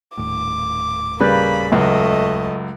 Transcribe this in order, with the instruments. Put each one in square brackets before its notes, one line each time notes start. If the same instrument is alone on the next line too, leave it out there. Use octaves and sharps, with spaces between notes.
[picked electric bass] D#1 A2 [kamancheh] D6
[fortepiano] C#3 G3 B4 [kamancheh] A#3 B5
[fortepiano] C#2 F#2 [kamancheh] A3 D#5